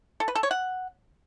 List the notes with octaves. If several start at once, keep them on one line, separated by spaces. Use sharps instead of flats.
A4
B4
A4
C#5
F#5